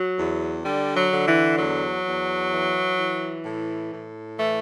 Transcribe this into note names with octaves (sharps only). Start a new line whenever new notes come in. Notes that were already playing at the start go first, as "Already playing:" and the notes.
Already playing: F#3
E2
D3 G3
F#3
D3
E3
E2 F#3
E2
E3
E3
A2
A2
E3 A3